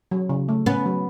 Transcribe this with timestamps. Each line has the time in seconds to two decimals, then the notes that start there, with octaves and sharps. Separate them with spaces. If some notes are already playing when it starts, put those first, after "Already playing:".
0.11 F#3
0.29 C#3
0.49 A3
0.66 B3 C#4
0.86 F#3